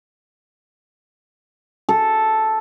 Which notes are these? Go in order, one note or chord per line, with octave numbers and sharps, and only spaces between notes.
A4